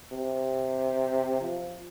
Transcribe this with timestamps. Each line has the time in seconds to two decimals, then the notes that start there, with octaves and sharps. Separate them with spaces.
0.12 C3
1.41 F3